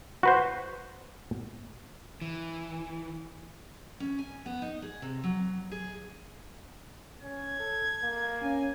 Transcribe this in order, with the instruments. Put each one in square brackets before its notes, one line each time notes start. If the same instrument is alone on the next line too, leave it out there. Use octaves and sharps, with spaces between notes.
[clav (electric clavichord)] F#4 B4 C5
[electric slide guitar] E3
[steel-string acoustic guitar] C#4
G#5
B3
D#4
G#4
C3
F#3
G#4
[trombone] C#4 [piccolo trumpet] G#6
[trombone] A4
A#3
[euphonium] C#4 [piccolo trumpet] G#5